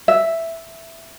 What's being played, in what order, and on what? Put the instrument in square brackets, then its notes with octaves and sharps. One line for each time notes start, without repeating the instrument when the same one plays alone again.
[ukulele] E5